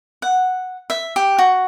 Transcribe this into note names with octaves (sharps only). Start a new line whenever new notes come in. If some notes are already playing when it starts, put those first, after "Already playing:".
F#5
E5
G4
F#4